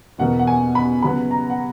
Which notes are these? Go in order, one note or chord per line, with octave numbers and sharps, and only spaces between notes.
E2 B2 A#3 F#5
F#5
G#5
B5
C#3 F#3 B3 B5
A#5
F#5